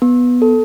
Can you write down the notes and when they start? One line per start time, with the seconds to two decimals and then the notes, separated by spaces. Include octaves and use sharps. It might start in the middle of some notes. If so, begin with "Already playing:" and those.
0.02 B3
0.42 A4